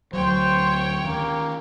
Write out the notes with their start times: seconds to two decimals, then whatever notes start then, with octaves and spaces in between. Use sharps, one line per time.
0.13 D2 F#3 C5 C#5 G5
1.05 D#3 A#3 C#4